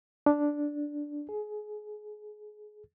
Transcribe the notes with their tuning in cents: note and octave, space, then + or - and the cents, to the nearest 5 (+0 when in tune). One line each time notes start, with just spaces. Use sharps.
D4 -5
G#4 +25